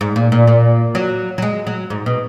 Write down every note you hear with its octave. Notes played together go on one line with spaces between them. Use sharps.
G#2
A#2
A#2
A#2
F#3
F#3
G#3
F#3
G#2
B2